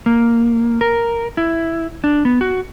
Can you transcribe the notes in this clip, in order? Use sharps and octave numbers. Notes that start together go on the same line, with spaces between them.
A#3
A#4
E4
D4
B3
F#4